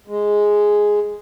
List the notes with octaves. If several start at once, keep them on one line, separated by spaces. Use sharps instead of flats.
G#3